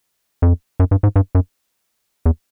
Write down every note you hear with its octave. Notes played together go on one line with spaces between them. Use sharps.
F2
F#2
G2
G#2
G2
F#2
E2